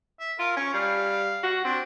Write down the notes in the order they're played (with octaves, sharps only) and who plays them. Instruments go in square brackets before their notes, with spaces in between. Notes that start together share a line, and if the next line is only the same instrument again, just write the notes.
[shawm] E5
[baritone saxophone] F4 [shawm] A#4
[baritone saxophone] C#4 [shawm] C#5
[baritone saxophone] G3 [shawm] F5
[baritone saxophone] F#4
[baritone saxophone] C4 [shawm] D4